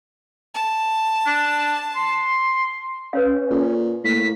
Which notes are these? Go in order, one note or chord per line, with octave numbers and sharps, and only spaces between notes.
A5
D4
C6
C#4 B4 C#5 F5
A#2 A4
A2 A#3 B6